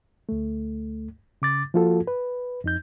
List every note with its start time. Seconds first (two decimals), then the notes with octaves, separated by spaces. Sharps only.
0.29 D2 A3
1.42 C#3 D6 A6
1.74 F3 A#3 F4 F#4 A4
2.07 B4
2.64 F2 D#4 G6